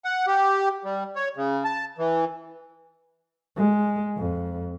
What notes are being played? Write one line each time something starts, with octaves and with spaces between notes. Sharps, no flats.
F#5
G4
G3
C#5
C#3
A5
E3
G#3
F2